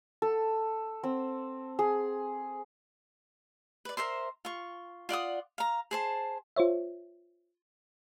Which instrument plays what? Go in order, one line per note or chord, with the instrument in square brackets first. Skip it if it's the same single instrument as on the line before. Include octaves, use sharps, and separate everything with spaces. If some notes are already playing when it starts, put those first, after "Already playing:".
[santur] A4
C4
G#4
[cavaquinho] B4 D5
A#4 C5 E5 C6
F4 C#6
F4 D5 F#5 D#6
F5 A#5
G#4 C5 A5
[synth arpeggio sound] F4 C5 C#5 E5